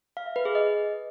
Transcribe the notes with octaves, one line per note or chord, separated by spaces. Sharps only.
F5
E5
B4
G#4
D#5